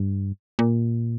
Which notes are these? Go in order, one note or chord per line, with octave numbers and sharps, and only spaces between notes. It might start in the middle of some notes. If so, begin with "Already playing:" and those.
Already playing: G2
A#2